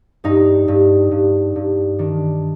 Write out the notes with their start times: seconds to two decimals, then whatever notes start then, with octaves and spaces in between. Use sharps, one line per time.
0.24 G2 D#4
0.68 G2
1.11 G2
1.56 G2
1.99 D#3 D4